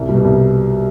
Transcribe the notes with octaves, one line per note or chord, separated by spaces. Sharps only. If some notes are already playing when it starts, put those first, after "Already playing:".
Already playing: C2
B2 G3
C2